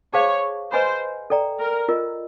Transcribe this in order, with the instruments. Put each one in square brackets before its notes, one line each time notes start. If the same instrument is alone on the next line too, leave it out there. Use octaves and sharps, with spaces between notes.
[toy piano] G#4 C5 F5 A5 [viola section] C#5
[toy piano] B4 D#5 G#5 B5 [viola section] C5
[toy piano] A4 D5 G5 A#5
[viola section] A#4
[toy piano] F4 A#4 D#5